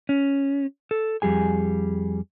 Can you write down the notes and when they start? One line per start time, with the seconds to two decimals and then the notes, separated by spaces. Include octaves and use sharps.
0.09 C#4
0.91 A4
1.22 F2 G3 G#4 G#5